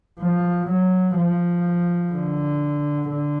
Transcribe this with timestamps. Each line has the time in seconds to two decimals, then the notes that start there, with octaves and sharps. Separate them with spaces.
0.20 F3
0.68 F#3
1.16 F3
2.12 D3
3.10 D3